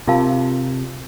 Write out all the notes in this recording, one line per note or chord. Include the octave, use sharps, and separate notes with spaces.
C3 F4 A#4 F5 A5